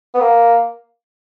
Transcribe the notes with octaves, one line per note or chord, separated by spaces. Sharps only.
B3
A#3